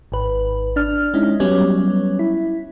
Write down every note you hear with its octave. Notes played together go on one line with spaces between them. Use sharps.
G#1 B4
D4 F6
G#3 C#4 D#4 E4
F#3 G3 B3 C#4
E4